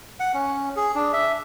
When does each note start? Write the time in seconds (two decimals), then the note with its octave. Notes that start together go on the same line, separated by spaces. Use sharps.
0.20 F#5
0.34 C#4
0.76 G#4
0.95 D4
1.13 E5